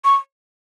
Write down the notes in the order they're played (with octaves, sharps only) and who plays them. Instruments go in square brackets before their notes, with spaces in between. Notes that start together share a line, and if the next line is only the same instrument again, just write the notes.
[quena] C#6